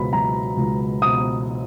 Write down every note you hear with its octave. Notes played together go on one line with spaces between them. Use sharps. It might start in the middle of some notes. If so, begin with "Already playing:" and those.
Already playing: C#2 B2 B5
F#3 A#5
C#2
B2 D#6